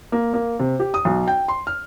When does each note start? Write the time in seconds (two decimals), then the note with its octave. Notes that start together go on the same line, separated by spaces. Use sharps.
0.12 A#3
0.34 A#3
0.59 C3
0.80 G4
0.94 D#6
1.05 B1
1.28 G5
1.48 C6
1.67 F6